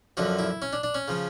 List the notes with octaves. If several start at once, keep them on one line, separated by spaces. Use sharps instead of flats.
F#2 D3 F3 F#4
E4
C#4
D4
D4
C#4
C#3 F3